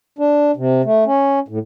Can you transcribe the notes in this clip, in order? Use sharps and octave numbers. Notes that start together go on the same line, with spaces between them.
D4
C3
A3
C#4
A2